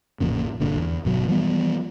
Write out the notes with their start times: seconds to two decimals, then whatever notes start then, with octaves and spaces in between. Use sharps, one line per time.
0.20 A1 F2 A#2 C#3
0.60 G1 A#2 D3
0.77 E2
1.05 G1 B2 F#3
1.28 E3 F3 G3 B3